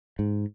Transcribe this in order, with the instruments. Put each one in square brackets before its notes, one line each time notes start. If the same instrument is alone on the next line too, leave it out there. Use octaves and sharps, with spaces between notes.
[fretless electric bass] G#2